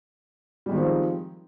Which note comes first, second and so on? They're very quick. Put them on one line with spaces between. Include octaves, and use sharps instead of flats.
G3 G#3 D#3 F3 C4